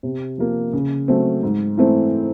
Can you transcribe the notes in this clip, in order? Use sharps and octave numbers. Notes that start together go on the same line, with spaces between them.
C3
F3 A#3
C#3
F#3 A3 C4
G#2
E3 A3 C4